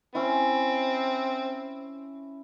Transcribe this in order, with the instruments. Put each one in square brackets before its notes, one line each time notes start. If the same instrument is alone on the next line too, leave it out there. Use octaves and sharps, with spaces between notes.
[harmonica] C4 [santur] C#4 E4